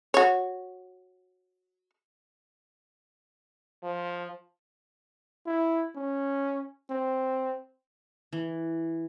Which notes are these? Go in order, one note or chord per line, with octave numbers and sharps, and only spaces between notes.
F#4 C#5
F3
E4
C#4
C4
E3